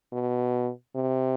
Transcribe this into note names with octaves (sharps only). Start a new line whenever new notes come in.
B2
C3